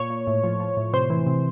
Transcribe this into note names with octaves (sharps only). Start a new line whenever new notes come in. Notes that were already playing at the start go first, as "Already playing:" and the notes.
Already playing: A#2 C#5
A#2
A2
F3
F3
A2
C3 C5
E3
C3